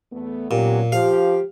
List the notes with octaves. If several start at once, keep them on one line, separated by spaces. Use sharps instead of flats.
E2 A3 B3
A#2 F#3 B3 C#4 G4
F3 G4 F5